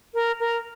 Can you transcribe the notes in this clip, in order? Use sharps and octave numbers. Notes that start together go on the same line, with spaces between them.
A#4
A#4